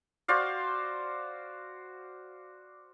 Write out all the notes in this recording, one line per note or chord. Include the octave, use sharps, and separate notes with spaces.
F#4 C5 D5 F5